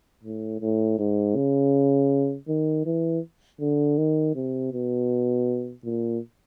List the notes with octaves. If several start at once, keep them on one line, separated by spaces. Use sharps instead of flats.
A2
A2
G#2
C#3
D#3
E3
D3
D#3
C3
B2
A#2